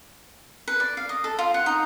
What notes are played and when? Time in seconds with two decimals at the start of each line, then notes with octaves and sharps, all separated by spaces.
0.68 B4
0.80 D5
0.97 F5
1.09 D#5
1.24 A4
1.39 F4
1.54 F#5
1.66 D#4